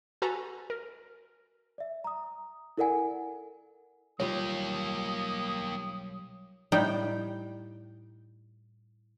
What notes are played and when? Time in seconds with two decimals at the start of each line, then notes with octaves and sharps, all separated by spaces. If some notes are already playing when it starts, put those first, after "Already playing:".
0.22 F#4 A4 B4 G#5 A#5
0.70 A#4
1.78 D5 E5
2.04 A#5 D#6
2.78 E4 A4 A#4 D5 F#5 G#5
4.20 B1 G3 A#3 F4 G4 C#5 D#6
6.72 A2 G3 D#4 G5